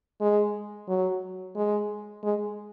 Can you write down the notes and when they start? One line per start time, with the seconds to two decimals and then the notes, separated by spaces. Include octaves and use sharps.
0.21 G#3
0.88 F#3
1.56 G#3
2.24 G#3